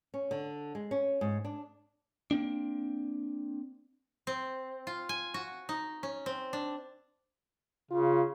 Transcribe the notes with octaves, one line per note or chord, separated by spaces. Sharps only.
C#4
D3
G#3
C#4
G#2
D4
A#3 C4 D4
C4
F4
G#5
F#4
D#4
C#4
C4
D4
C#3 F4